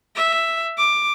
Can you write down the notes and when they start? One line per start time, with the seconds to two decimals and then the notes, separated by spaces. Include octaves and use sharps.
0.16 E5
0.77 D6